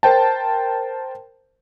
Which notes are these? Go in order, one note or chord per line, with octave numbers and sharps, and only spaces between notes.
A#4 C5 G5 A5